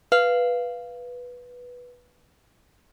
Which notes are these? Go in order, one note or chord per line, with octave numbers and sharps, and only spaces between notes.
B4 F5